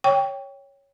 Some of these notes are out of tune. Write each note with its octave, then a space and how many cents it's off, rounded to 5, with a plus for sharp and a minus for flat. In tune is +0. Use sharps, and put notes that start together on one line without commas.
C#5 +0 G5 +5 C#6 +30